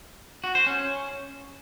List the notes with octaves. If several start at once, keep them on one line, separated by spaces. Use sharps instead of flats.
F#4
C5
C#4